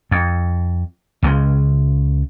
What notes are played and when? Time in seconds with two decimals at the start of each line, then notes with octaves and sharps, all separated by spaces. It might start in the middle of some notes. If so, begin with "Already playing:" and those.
0.11 F2
1.23 C#2 C#3 G3 G#3